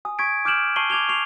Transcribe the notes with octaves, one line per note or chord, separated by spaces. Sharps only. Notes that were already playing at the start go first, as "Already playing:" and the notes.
G#5 D#6
C#6 D#6 G#6 B6 D7
D6 F6 G6 D7 E7 F#7
A5 C#6 C7 D#7 F#7 G7
D6 G#6 F7 G7
C#6 C7 F7